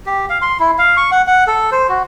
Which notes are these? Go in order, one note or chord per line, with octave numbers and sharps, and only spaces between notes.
G4
F5
C6
E4
F5
C#6
F#5
F#5
A4
C5
F#4